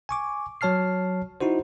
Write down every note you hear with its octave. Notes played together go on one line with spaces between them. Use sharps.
G#5 C#6 D6
F#3 C#5 A5 F6 C7
D#4 E4 F#4 C5